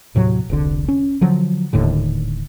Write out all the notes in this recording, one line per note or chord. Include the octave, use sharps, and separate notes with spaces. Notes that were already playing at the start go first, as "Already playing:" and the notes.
D#2 A2 C3 F#3
E1 C2 D3
C#4
D3 F3 F#3
D#1 D#2 A2 D3